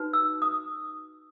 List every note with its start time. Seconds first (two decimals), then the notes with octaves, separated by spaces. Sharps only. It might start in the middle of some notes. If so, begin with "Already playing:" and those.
Already playing: D#4 F#4 B4
0.13 E6
0.42 D#6